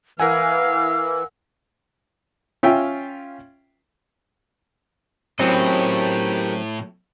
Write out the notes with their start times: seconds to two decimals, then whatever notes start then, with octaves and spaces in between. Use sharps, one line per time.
0.20 E3 A#4 F5 F#5 G#5 E6
2.63 C#4 F4 E5 F5 G5
5.39 A2 F#3 C4 C#4 G4 A#4 D#5